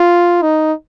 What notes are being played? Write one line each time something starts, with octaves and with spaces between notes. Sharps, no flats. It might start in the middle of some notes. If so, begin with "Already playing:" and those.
Already playing: F4
D#4